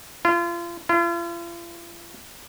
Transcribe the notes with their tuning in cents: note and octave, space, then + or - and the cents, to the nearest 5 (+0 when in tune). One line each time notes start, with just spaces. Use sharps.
F4 -35
F4 -45